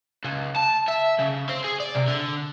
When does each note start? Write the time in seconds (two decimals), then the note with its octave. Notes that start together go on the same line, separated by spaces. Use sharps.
0.24 C#2
0.56 A5
0.88 E5
1.19 C#3
1.49 C4
1.64 G#4
1.80 D5
1.95 C3
2.08 D3